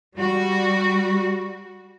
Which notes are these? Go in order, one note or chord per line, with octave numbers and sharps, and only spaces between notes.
G3 F#4